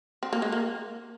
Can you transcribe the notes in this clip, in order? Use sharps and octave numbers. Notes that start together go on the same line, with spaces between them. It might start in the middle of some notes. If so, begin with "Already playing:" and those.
C4
A#3
G#3
A#3